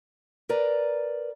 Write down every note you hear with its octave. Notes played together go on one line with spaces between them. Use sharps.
A#4 B4 D5 A#5